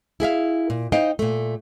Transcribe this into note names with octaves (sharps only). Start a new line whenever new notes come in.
E4 G#4 E5 F5
A#2
D#4 C5 D#5 F5 G5
A#2 A3